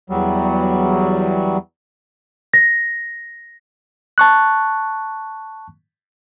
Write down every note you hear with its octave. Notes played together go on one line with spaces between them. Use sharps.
E2 F#3 G3
A#6
A5 C#6 F#6